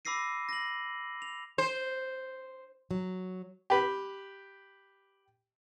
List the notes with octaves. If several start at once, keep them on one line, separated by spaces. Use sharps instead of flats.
B5 D6 E6 A#6 C7 D#7
A#6 F#7
F7
C5
F#3
G4 B4